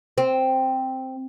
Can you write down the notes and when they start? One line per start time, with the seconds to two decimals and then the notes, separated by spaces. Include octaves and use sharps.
0.18 C4